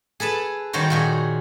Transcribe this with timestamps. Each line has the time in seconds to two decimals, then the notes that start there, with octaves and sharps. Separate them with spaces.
0.20 G#4 A4 B4 A5
0.73 D#3 G3 F#4 C5 C#5
0.90 A#2 F#4 G#4